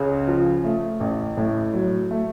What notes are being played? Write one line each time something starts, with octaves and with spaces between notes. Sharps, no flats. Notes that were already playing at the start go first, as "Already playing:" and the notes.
Already playing: C#2 C#3
F3
A3
A1
A2
F#3
A3